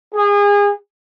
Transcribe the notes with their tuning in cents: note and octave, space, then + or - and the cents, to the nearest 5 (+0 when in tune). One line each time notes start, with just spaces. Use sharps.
G#4 -30